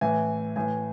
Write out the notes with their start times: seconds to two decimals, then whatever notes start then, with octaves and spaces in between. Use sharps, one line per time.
0.01 A2 E3 G#5
0.56 A2 E3 G#5